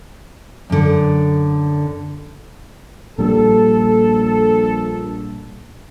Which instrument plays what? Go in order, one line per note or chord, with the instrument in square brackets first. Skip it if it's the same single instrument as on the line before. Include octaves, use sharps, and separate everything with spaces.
[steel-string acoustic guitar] F#2 D3
[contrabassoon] A#1 [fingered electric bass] A#2 G3 [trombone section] A4